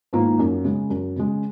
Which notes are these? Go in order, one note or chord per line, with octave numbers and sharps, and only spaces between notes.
G#2 D#3 A#3 F4
F#2
C#3 G#3
F#2
C#3 G#3